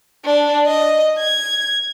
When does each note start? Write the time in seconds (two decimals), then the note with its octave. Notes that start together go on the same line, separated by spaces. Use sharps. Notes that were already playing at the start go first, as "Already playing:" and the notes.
0.25 D4
0.66 D#5
1.19 G#6